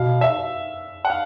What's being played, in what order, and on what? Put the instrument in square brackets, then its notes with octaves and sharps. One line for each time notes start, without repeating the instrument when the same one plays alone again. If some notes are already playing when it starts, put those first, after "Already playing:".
Already playing: [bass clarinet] B2 [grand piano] F5
[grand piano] E5
F#5
F5